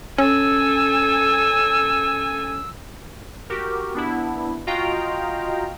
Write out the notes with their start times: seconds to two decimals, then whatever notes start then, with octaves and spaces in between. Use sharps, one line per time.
0.18 C#4 A4 G#5 E6
3.50 F#4 G4 A#4
3.94 B3 D4 E4
4.67 F4 F#4 D#5 F5 G5 A#5